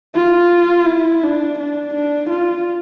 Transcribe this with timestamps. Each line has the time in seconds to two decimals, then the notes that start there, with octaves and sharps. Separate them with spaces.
0.15 F4
0.86 E4
1.23 D4
1.59 D4
1.94 D4
2.30 F4